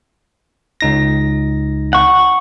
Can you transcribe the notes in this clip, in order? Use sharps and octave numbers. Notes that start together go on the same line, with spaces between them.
C#2 D#4 A#6
F#5 C#6